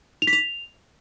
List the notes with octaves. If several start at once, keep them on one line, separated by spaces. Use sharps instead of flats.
F7
B6
F7